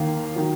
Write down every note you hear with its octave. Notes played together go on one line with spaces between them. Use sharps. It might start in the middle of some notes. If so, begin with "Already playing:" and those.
Already playing: D#2 D#3 A#3 F5
D#3 F#3